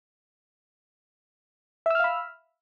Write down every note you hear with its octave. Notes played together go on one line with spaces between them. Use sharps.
E5 F5 B5 E6 F6